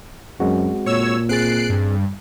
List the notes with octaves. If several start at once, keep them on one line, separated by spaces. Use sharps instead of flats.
F#2 G#3 C4 F#4
A#2 C#5 E6
C4 G#4 F#6 A6 C7 D7
G2